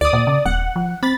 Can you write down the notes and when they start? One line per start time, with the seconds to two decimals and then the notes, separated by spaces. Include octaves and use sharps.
0.01 D2 D5 D#6
0.13 A#2
0.27 C#3
0.46 D#1 F#5
0.76 F3
1.03 C4 B5 A6